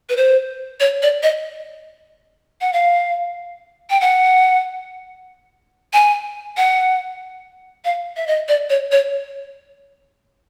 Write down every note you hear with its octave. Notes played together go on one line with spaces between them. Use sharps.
B4
C5
C#5
D5
D#5
F#5
F5
G5
F#5
G#5
F#5
F5
E5
D#5
D5
C#5
C#5